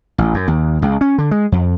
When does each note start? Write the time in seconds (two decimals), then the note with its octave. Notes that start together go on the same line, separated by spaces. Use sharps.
0.18 A1
0.34 F#2
0.48 D#2
0.82 C#2
1.01 C#4
1.18 D3
1.31 G#3
1.52 F2